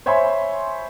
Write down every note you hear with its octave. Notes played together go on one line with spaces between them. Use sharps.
C5 C#5 E5 G#5 B5 C6